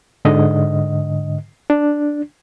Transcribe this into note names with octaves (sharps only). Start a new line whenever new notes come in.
G#2 D3 D#5
D4